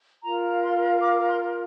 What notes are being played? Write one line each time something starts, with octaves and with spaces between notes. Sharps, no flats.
F4 A#4 A#5
C6
D6
C6